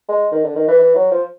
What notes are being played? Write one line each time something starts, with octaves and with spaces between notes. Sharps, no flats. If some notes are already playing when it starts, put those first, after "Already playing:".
G#3
D#3
D3
D#3
E3
E3
F#3
F3